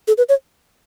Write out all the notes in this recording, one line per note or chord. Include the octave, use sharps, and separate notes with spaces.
A4
B4
C#5